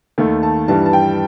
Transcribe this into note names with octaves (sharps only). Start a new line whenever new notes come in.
D#2 D#3 A3
A5
G2 E3 G3 A5
A5
G5